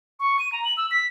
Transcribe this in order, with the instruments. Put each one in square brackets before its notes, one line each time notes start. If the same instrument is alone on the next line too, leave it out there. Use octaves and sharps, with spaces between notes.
[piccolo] C#6
D#7
A#5
F#7
E6
B6